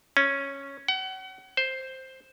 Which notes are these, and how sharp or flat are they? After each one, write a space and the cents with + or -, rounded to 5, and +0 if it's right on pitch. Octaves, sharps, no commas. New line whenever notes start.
C#4 -5
F#5 +35
C5 +5